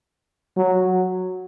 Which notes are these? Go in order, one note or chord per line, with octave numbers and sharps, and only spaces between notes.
F#3